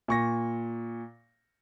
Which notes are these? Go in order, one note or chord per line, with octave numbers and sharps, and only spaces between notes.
A#2 C#6 A#6